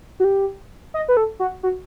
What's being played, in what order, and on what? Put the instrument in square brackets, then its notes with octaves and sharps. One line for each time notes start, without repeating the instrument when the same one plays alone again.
[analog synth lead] F#4
G4
D#5
B4
A4
F#4
F#4